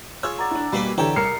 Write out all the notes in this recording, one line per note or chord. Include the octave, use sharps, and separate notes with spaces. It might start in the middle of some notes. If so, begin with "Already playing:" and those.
F4 G#4 C#5 E6
D5 F#5 A#5
D4 E4
B2 G3 A#3 B4 B5
D3 E3 G4 A4 C#5 G5 A#5 E6
C2 A#4 F6 C7 C#7